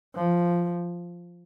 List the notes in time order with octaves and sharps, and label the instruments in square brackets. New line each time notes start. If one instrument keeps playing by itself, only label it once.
[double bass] F3